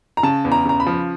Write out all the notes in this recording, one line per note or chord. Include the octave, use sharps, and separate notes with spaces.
A#5
C#3 A5
E2
A#5
C#3 A#5
B5
F3